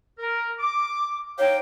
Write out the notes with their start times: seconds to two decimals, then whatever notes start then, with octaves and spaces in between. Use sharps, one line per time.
0.19 A#4
0.59 D6
1.39 D#4 C#5 F5 G5